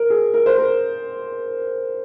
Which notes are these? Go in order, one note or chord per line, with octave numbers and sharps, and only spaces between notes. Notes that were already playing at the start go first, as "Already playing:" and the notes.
Already playing: A#4
G#4
A#4
C5
A#4